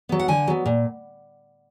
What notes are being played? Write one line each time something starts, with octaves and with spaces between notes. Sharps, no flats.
F#3 B3
F#5
D3 G#5
F#3 B3
A#2